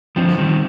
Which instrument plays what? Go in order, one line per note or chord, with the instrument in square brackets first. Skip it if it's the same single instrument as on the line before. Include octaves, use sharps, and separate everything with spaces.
[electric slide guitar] D3 F3 [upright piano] C4
[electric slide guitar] D#3 G3